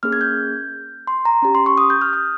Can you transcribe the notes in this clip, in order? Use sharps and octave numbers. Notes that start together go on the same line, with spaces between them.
A#3 C#4 G#4 F6
G#6
G6
C6
A#5
C#4 G4
C6
C#6
D#6
G6
F6
D#6